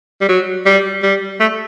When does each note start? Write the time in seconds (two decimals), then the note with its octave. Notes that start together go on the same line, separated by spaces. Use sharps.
0.21 G3
0.29 F#3
0.66 G3
1.03 G3
1.41 A3